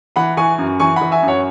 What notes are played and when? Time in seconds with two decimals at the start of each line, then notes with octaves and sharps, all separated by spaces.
0.16 E3 F#5 B5
0.37 E3 G#5 C#6
0.58 F#2
0.80 E3 G#5 C#6
0.96 E3 F#5 B5
1.11 E5 G#5
1.23 F#2
1.28 C#5 F#5